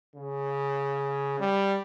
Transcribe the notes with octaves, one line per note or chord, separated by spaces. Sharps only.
C#3
G3